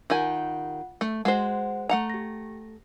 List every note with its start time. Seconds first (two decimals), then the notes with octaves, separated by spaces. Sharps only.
0.10 D#3 F4 G4 F#5 G#5
1.01 A3
1.25 G#3 F#4 C5 F#5
1.89 A3 F#5 A#5
2.10 G4 A#6